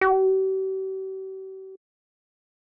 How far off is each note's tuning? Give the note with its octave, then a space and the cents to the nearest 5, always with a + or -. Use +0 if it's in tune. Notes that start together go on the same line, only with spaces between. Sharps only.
G4 -45